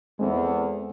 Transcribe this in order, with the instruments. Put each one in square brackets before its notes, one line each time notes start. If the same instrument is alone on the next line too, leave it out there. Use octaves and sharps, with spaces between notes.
[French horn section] E2 [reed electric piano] G#3 C4 A4